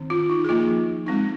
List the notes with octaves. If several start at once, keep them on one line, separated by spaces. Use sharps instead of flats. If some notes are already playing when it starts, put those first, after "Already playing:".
Already playing: D#3 C4 D#4
F4
D#4
G#4
F3 A#3 D#4 F4
G#3 C4 D#4